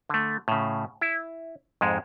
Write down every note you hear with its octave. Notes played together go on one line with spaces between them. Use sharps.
D3 A3
A2 C#3
E4
F2 G#2 G#3